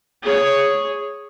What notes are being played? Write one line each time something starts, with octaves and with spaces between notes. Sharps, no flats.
G#4 C#5